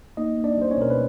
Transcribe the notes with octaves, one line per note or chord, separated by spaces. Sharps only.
A#3 D#4 D#5
A#3
D4 D5
G3 C5
C#4 C#5
B2 A#4
B4